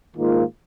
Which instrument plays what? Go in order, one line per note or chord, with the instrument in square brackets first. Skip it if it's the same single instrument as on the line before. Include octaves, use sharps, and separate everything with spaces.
[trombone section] G#2 D#3 A#3 F4